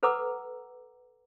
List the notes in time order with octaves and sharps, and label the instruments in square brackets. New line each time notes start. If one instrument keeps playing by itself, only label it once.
[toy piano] A4 B4 F#5 A#5 D6 E6